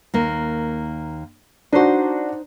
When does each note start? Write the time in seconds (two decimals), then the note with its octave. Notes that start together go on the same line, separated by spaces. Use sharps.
0.14 D#2 A#3
1.73 D4 D#4 F#4 C5